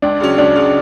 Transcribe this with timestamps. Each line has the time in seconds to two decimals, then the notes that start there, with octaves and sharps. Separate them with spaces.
0.02 C#2 D4
0.20 C#3 F#3 C#4
0.38 C#2 D4
0.55 C#3 F#3 C#4